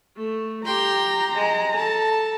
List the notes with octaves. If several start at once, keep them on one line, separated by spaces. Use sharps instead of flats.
A3
G4 G5 A#5 C6
G#3
A4 A5